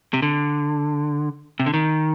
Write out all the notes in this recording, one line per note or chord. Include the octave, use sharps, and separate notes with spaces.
C3
D3
C3
D3
D#3